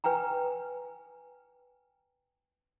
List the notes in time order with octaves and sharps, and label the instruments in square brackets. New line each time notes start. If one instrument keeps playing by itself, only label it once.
[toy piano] B4 G5 G#5 A#5